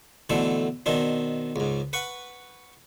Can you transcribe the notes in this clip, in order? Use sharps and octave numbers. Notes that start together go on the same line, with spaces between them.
B2 D3 E3 A3 C4
B2 D#3 C4 D4
C#2 G#2
B4 F#5 C#6